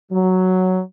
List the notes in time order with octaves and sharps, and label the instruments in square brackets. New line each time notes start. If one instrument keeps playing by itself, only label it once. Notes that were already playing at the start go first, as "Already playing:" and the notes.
[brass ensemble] F#3